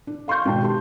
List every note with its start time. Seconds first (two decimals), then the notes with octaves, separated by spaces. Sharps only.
0.07 D4
0.28 F5 C6 C#6 G6
0.45 G#1 B2 G5 A5
0.63 G4 C6